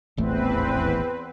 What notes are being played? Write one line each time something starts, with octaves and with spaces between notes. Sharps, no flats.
D#1 A1 E2 A3 C4 B4